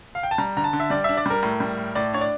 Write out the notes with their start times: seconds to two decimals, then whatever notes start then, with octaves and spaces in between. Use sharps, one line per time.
0.15 F5
0.23 G5
0.31 A5
0.38 G3 A#5
0.57 D3 A#5
0.64 A5
0.73 D3
0.80 E5
0.90 G3 D5
1.04 D4 E5
1.17 D5
1.26 G3 A#4
1.43 A2
1.60 G3
1.77 A2
1.95 A2 D5
2.13 D4 C#5
2.21 D5